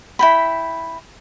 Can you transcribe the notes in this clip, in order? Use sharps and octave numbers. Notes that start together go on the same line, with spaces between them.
E4 G5 B5